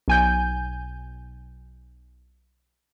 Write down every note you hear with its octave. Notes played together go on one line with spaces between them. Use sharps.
B1 G#5 G6